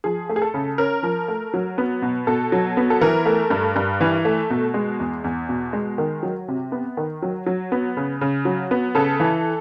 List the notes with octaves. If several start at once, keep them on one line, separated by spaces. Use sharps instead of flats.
F3 G#4
A3
G#4
A4
C#3
C#4 A#4
F3
A3
F#3
B3
B2
B2 A4
F#3
B3
A4
E3 A#4
A3
G2
G2
E3
A3
B2
G#3
E2
E2
B2
G#3
D#3
F#3
C3
B3
D#3
F#3
F#3
B3
C#3
C#3
F#3
B3
C#3 A4
E3